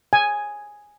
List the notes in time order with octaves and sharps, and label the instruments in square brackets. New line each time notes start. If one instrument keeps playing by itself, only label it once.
[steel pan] G#5